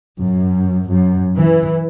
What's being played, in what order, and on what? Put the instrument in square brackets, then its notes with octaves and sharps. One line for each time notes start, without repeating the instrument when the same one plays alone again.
[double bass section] F#2
F#2
E3